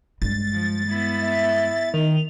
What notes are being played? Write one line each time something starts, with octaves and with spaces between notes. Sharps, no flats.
G2 G#3 A6
F3
B3 E4
E5
D#3 F7